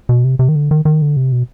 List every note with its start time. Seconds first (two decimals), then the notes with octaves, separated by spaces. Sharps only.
0.09 B2
0.24 C3
0.39 C3
0.49 D#3
0.56 D3
0.71 D#3
0.85 D#3
1.02 D3
1.16 C3
1.32 B2